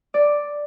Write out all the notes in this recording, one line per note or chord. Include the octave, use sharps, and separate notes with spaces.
D5